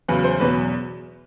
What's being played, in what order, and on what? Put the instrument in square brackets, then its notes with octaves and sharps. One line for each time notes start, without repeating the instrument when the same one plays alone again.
[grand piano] E2 C#3 F#3 B4
C5
E2 B2 F#3 B4